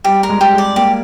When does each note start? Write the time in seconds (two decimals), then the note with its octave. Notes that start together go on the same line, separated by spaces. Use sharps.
0.04 G3 G4
0.23 A#4
0.29 G#3
0.41 G4
0.53 G#3 D5
0.76 A#3 G4